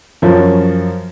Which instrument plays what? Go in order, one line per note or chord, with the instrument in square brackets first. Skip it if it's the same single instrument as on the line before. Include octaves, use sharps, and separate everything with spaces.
[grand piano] F#2 F3 C#4